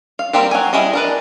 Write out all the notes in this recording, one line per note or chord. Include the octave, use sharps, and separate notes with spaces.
F5
G3 A#3 C4 G4 C5
F#3 G#5
G3 E4 G#4 D#5
D4 A#4 B4